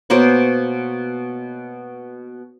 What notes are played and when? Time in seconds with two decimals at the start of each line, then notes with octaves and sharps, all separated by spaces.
0.10 B2 A#3 C5 C#5